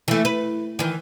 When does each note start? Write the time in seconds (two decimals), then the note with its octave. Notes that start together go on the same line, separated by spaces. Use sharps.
0.08 E3 A3
0.25 B4
0.79 D#3 E3